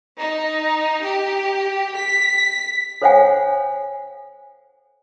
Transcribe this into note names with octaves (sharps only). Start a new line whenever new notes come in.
D#4
G4
B6
A4 C5 C#5 F5 F#5 G#5